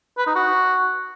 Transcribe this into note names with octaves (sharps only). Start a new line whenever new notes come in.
B4
D#4
F#4